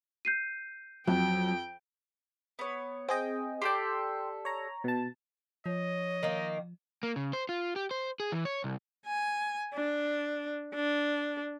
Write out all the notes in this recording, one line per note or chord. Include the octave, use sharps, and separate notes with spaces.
G6 C7 D#7
F2 F#3 G5
B3 C#5
C4 G#4 D#5 G5
G4 A4 D5 G5 C6
C#5 A#5
B2 A5
F3 C#5 D#5
D#3 A#3
A#3
C#3
C5
F4
G4
C5
G#4
E3
C#5
C2
G#5
D4
D4